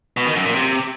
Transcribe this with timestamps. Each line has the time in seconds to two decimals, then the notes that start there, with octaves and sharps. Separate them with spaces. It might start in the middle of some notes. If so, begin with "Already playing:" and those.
0.17 B2
0.26 D#3
0.36 F#2
0.46 A#2
0.55 C3